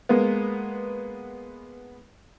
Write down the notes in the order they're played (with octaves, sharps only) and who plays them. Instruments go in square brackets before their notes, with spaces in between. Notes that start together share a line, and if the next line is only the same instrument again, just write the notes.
[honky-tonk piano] G#3 A#3 B3